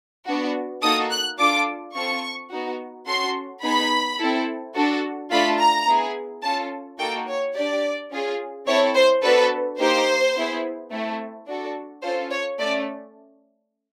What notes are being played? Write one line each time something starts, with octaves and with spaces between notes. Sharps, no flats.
B3 D4 F#4
A#3 D#4 F#4 A4 D#6
F#6
D4 F4 A4 D6
C4 F4 A4 C#6
B3 D#4 F#4
C#4 F#4 A4 C6
B3 D#4 G#4 B5
C4 E4 A4
D4 F#4 A4
A3 D4 F4 A4 B5
A#5
B3 E4 G#4
C#4 F4 A4 A5
A#3 D#4 F#4 A4 G5
C#5
D4 G4 D5
C#4 F4 G#4
C4 E4 A4 C#5
C5
B3 D4 F#4 A4 B4
A#3 D#4 G4 C5
B3 E4 G#4
A3 C4 E4 A4
D4 F#4 A4
C#4 F4 A4 C5
C#5
A3 C#4 D5